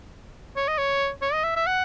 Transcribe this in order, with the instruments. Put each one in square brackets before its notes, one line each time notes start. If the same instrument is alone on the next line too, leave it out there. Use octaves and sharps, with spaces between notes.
[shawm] C#5
D#5
C#5
C#5
D#5
E5
E5
F#5